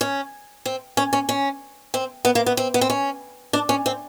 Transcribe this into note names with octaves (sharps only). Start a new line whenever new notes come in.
C#4
C4
C#4
C#4
C#4
C4
B3
A#3
B3
C4
B3
C4
C#4
D4
C#4
C4